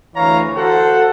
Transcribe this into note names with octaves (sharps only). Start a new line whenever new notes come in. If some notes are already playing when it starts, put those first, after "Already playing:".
D2 E3 C#5 F5 A#5
F#4 A4 C5 F#5